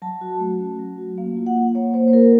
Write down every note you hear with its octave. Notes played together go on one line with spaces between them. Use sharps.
F#3 A5
F#4
A3
C#4
F#3
F#4
A#3 F5
F4
F#5
F4
A#3 C#5
A#3 C5
C5
F4 A#4